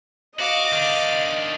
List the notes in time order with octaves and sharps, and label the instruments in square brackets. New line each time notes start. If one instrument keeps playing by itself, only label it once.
[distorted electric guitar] F#4 [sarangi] D#5 [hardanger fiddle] F5 D6
[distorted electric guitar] D#3 D4